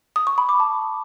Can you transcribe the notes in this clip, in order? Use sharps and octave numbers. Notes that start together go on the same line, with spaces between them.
D#6
C#6
B5
D6
A5